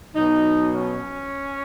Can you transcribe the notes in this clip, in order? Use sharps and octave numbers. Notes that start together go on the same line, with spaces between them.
B2 F#3 D#4
C#4